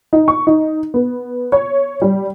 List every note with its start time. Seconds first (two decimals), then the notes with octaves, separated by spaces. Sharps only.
0.13 D#4
0.28 C#6
0.47 D#4
0.94 B3
1.52 C#5
2.02 G3